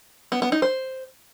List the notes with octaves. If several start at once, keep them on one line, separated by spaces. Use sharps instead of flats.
B3
B3
D#4
C5